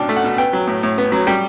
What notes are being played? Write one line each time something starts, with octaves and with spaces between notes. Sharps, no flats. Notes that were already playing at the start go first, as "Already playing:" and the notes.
Already playing: C#2 B2 D4 G5 A5
A3
F#5
B2
B3 G5
F#3
A2
A2
B3
F#3
G3 G5